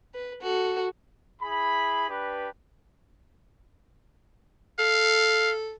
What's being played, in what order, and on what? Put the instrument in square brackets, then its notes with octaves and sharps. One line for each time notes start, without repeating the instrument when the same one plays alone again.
[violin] B4
F#4 A4
[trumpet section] E4 G#4 B5
D4 G4 B4
[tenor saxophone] A4 [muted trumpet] F5